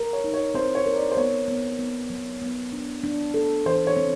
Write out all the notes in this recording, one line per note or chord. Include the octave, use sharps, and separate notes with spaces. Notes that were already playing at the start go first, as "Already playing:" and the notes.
Already playing: A#4
C#5
D#4
C#5
C4 C5
C#5
A#4
D5
C5
B3 C#5
B3
B3
F#3
B3
D4
D4
A4
E3 C5
C#5
C4